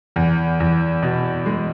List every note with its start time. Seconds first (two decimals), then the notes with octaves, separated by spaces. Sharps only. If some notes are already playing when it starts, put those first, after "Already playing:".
0.16 E2
0.60 E2
1.03 B2
1.46 G#3